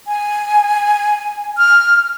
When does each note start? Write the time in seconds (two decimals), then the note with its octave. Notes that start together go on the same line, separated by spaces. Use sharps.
0.07 G#5
1.58 F6